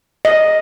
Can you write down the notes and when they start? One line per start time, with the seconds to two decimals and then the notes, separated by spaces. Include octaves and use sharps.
0.25 D#5